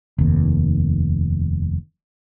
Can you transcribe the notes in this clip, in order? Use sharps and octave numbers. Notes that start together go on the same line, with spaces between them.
F1 D#2